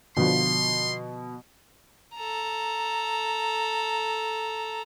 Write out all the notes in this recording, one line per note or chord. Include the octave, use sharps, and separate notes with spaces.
B2 D3 F3 C6
A4 A#5